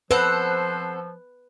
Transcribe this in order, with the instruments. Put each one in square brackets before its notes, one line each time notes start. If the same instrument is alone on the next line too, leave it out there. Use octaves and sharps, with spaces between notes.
[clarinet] F3 [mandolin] C4 A4 F#5 [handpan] B4 [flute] C5